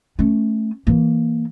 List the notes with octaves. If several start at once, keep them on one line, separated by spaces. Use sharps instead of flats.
A3 C#4
E3 A#3